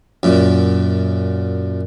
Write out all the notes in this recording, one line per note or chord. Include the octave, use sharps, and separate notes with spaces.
F#2 A#2